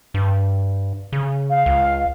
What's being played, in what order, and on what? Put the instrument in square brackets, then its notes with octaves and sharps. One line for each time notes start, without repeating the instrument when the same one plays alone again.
[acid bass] G2
C#3
[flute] F5
[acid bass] C#2